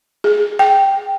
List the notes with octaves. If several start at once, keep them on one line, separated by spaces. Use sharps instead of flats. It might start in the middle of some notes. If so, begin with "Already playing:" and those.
G#4
G5